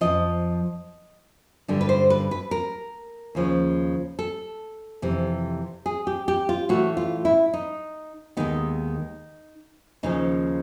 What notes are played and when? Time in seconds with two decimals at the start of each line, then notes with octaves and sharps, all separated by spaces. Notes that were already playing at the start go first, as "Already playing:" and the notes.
0.01 F2 C3 F3 D#5
1.68 G2 D3 G3
1.81 B4
1.89 C5
2.10 B4
2.31 B4
2.51 A#4
3.35 D#2 C#3 F3
4.19 A4
5.02 F2 C3 E3
5.86 G#4
6.07 G4
6.28 G4
6.49 F4
6.69 A2 E3 A3 F#4
6.97 F4
7.25 E4
7.53 D#4
8.37 D#2 D#3 G#3 B3 D#4
10.03 D#2 C#3 F3 D#4